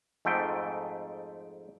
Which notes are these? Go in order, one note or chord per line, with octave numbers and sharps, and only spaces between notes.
F2 G#2 A3 G5